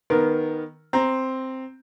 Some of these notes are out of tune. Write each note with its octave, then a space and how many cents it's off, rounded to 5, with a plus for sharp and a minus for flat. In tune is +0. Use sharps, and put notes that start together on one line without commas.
D#3 +0 B3 -10 A#4 +0
C4 +0 A#5 +0